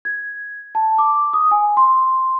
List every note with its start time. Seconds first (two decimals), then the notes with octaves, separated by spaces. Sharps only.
0.05 G#6
0.75 A5
0.98 D6
1.33 D#6
1.51 G#5
1.77 C6